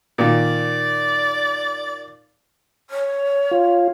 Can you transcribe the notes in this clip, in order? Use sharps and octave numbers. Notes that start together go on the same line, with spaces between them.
A#2 D#3 D5
C#5
F4